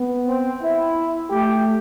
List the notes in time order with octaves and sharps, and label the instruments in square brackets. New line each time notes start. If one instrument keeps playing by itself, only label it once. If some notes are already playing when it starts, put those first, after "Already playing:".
Already playing: [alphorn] B3
[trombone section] C4
E4
[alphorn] A3 [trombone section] G4